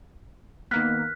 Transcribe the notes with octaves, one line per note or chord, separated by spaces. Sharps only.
D#3 A#3 B3 F6 F#6 B6